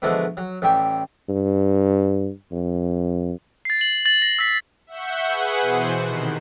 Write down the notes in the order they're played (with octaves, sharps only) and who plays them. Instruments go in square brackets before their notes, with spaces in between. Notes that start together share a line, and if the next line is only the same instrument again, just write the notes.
[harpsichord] B2 D3 E3 F3 G#3 A3
F#3
A1 G3 E5 G5
[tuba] G2
F2
[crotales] A6 C7
F#7
A6 F#7
A#6
E6 B6
[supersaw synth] E5 F#5 C#6 G6
G#4 B4 F#5
B2 E3 C5
C3 D#3